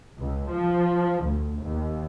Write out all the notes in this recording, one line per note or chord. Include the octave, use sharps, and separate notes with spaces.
C#2
F3
D2
D#2